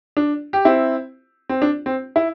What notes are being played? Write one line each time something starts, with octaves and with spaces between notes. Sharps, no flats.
D4
G4
C4 E4
C4
D4
C4
E4